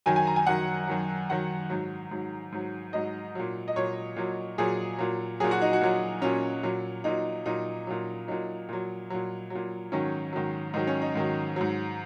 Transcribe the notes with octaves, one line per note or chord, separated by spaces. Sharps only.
F#2 D#3 F#3 G#5
G#5
A#5
G#5
F#2 D#3 F#3 F#5
F#2 D#3 F#3
F#2 D#3 F#3 F#5
G#2 F#3
G#2 F#3
G#2 F#3
G#2 F#3 D#5
A#2 F#3
D#5
A#2 F#3 C#5
A#2 F#3
A#2 F#3 G#4
A#2 F#3
A#2 F#3 G#4
F#4
D#4
F#4
A#2 F#3
A#2 F#3 C#4
A#2 F#3
A#2 F#3 D#4
A#2 F#3 D#4
A#2 F#3
A#2 F#3 D#4
A#2 F#3
A#2 F#3
A#2 F#3
G#2 D#3 F#3 C#4
G#2 D#3 F#3
G#2 D#3 F#3 D#4
C#4
D#4
G#2 D#3 F#3
G#2 F#3